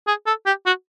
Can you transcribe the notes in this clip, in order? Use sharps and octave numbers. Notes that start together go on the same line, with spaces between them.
G#4
A4
G4
F#4